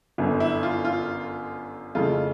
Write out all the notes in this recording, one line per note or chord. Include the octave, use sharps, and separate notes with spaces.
G1 F#2 D3
E4
F4
F4
F2 C#3 E3 A3 F4